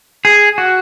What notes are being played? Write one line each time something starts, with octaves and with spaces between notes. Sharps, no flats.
G#4
F#4